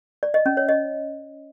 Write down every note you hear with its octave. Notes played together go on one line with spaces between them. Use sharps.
D5
D#5
C#4
C#5
D#5